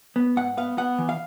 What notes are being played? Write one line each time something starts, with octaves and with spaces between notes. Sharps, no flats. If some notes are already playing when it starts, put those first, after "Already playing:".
B3
G#2 F#5
B3 F5
B3 F#5
E3
F5